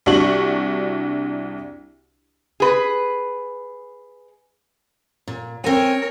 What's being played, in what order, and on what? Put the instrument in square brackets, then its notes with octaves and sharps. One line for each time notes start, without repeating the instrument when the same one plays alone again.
[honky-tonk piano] C2 D4 F#4 C#6 F#7
[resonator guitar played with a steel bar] G#4 B4
[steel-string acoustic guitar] A#2
[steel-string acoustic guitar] C4 G#5 [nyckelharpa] A#4 C#5